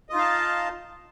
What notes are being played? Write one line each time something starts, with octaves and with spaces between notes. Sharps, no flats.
D#4 F4 D#5 F5 A5